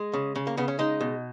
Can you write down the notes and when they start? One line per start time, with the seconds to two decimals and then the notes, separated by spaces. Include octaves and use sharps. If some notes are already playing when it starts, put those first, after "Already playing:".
Already playing: G#3
0.13 C#3
0.35 C#3
0.47 A#3
0.57 C#3 B3
0.68 C#4
0.79 G#3 D#4
1.01 B2